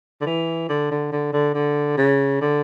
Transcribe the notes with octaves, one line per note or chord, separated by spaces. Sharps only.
D3
E3
D3
D3
D3
D3
D3
C#3
D3